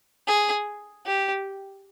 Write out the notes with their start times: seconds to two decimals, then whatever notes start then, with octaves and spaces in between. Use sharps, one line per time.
0.27 G#4
1.06 G4